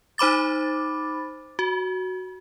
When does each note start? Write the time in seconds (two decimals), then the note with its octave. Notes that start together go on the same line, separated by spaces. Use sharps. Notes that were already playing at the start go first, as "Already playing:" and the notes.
0.18 D#4 C5 B5 D6 A6
1.59 F#4